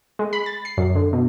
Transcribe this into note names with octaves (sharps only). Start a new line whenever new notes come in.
G#3
B5
A6
C7
F#2
D3
B2